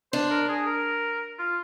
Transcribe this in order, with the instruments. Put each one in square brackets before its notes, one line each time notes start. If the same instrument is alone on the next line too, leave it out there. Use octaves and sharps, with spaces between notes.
[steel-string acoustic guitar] D4 [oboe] C5
[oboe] A#4
G#4
A#4
F4